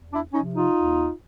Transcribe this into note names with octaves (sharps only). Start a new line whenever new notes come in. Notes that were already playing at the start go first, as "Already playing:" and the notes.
Already playing: E2
D4 E4
C3 F3 C#4 D#4
D#4 F4
D#2